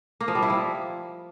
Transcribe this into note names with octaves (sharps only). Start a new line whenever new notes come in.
A#3
F3
G3
E4
F3